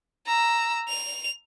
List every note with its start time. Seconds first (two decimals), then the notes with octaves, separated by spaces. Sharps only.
0.27 A#5 E6
0.89 F7